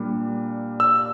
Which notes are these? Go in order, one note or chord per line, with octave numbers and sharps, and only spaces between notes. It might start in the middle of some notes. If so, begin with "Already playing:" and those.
Already playing: A#2 G3 A#3 D4
E6